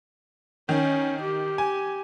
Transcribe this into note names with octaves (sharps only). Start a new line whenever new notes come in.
D#3 C#4
G4
G#5